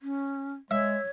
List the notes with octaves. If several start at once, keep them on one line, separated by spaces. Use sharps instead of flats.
C#4
G#3 C#5 E5